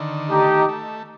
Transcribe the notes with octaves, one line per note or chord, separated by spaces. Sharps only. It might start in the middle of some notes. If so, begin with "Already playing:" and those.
Already playing: D3 D#3
A3 D#4 G4
A3